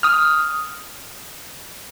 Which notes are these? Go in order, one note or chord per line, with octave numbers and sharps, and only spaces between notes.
D#6 F6